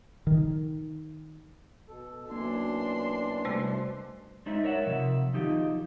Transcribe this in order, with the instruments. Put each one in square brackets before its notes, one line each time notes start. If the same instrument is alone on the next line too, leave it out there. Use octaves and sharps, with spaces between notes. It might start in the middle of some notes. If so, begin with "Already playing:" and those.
[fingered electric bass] D#3
[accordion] B2 A4
[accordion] F#2 B2 E3 [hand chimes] A#3 [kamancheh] D4 C6
[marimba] C3 G3 A3 [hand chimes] C5
[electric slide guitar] G#3 D4 D#4 C5 E5
A#4 C#5 E5 F#5
C3 F3 E5
D#3 F3 D#4 G4